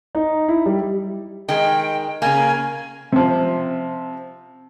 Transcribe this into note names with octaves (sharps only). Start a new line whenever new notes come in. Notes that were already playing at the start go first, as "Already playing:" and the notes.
D#4
E4
G3
D#3 G#3 G5
C#3 A#3 G#5
C3 F3